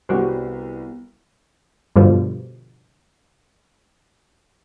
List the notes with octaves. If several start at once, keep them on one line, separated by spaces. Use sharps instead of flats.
C2 G3 B3 F#4 C5
G2 B2 D3 F3 G3